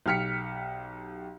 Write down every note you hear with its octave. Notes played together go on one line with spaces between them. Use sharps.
B1 G4 F6 B6 C#7